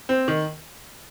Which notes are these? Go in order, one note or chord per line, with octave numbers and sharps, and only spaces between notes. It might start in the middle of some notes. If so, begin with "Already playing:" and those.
C4
D#3